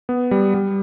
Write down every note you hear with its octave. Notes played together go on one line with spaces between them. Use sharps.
B3
G3
G3